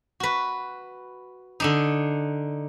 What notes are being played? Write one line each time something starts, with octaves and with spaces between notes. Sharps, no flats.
F#4 B4
D3 D4 D#4